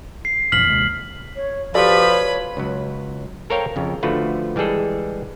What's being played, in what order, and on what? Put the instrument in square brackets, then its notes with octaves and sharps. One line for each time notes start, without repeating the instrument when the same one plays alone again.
[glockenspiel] C7
[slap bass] A#1 F2 E3 [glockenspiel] F6 B6 F#7
[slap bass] D#2 C3 G#3
[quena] C#5
[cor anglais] F3 [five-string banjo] F#4 A4 D5 [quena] G4 [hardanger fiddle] B4 B5
[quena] C#5
[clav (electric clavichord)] C#2 F#3
A4 A#4 C5 C#5 F5 G5
F2 C#3
D3 F3 A3 F4 F#4 B4
E3 G3 G#3 G#4 A4